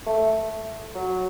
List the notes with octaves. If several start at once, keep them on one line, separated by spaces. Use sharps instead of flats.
A3
F#3